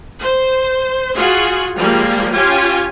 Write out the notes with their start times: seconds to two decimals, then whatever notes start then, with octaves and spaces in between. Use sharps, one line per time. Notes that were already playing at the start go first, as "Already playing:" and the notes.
0.19 C5
1.15 F4 F#4 G#4
1.76 F3 G3 G#3 A#3
2.34 C#4 F4 G4 G#5